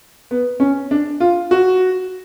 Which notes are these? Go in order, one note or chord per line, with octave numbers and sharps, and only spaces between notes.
B3
C#4
D4
F4
F#4